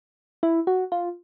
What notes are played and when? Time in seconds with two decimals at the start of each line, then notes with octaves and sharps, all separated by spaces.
0.43 E4
0.67 F#4
0.92 F4